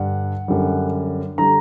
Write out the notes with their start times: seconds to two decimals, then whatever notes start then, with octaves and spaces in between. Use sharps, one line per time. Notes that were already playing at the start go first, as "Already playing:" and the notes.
Already playing: G2 D3 G3 F#5
0.48 F#2 D3 G3
1.38 D3 G3 A#5